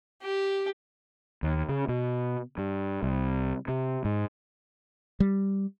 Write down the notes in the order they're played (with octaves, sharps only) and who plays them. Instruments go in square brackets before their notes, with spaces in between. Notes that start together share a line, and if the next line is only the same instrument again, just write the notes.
[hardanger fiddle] G4
[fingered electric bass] D#2
C#3
B2
G2
C2
C3
G#2
[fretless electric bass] G3